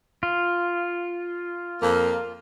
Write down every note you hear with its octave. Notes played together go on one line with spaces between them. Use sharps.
F4
F2 A#3